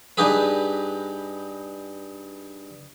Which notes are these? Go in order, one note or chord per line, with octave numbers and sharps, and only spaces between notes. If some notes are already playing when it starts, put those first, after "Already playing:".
G2 D#4 G4 G#4 B4